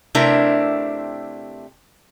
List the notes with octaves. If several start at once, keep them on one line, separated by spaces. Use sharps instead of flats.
C3 A3 C4 D4 E4 A#4